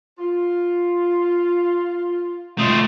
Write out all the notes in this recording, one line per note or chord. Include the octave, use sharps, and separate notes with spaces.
F4
A3 F4 D#5